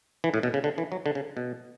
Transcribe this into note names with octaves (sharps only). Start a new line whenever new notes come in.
E3
A2
B2
C#3
D3
E3
F#3
D3
C#3
B2